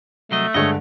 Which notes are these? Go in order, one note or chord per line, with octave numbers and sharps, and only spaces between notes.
C2 F#3 A3 D#5
G2 D3 G#3 C#5 D#5